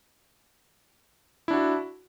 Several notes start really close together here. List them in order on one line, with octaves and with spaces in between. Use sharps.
E4 D4 F#4